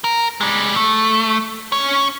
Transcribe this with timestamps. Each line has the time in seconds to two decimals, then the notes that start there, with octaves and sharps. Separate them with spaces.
0.04 A#4
0.41 G3 G#3
0.76 A3
1.72 C#4 C#5